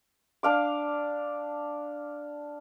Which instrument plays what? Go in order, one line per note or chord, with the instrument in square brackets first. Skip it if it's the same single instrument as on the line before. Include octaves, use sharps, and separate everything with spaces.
[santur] D4 F5 D6